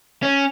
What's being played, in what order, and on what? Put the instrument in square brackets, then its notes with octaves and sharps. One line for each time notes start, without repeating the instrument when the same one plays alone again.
[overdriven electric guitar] C#4